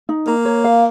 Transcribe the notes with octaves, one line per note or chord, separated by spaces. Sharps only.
D#4
A#3 A#5
C#5
F5